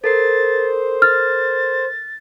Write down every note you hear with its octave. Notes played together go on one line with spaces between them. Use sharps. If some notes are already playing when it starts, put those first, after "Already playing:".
A4 A#4 C5 A6 C7
F6 A6